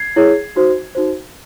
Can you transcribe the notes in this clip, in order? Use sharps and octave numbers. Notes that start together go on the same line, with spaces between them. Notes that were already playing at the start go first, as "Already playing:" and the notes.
Already playing: G#6 C7
E4 G#4 C#5
D#4 F#4 C5
D#4 F#4 C5